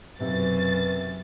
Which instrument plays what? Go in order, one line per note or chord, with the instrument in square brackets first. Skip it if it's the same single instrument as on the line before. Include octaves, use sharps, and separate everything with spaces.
[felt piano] B1 C3 [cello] F#2 [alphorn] B4 [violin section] A6